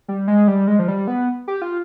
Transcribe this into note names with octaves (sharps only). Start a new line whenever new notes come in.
G3
G#3
G3
G#3
F3
G3
B3
G4
F4